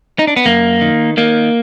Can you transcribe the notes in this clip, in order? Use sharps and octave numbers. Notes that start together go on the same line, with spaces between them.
D#4
D4
B3
F#2 A#3
D#3
D#3 A#3